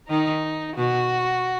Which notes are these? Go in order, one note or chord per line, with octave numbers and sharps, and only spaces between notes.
D#3 D#4
B2 F#4